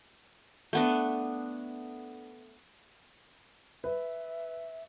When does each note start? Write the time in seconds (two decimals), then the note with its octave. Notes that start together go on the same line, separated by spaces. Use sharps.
0.73 A3 B3 D4
3.84 B4 E5